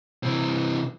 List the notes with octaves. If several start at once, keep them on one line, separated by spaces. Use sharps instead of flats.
C3 E3